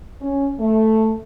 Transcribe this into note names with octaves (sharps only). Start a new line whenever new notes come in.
C#4
A3